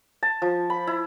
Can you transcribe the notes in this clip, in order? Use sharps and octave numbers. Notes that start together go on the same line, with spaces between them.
A5
F3
B5
E4